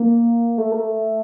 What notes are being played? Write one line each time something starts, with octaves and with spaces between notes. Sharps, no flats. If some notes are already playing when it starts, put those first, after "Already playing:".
Already playing: A#3
A3
A#3
A3